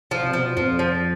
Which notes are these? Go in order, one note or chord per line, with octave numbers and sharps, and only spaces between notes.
F3
C3
B2 F3
F2 F3
F3